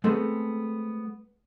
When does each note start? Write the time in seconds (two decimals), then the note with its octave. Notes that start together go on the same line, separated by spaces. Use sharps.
0.04 G#3 A3 B3 C4 G#4 A4